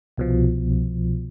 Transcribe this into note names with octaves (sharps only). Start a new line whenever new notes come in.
C2 B2 F3